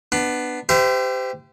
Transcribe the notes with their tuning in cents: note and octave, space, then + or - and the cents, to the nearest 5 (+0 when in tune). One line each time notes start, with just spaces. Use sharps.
B3 +5 D4 +20
G4 +0 C5 -35 E5 +30